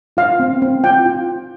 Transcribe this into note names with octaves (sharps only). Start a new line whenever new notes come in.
F4 F5
C4
C4
F4 G5
F4